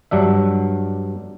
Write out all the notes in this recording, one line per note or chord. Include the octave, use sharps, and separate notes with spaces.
G2 F#3 D4 E5